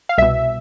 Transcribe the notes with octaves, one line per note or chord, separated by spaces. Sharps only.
F5
C2 B2 E5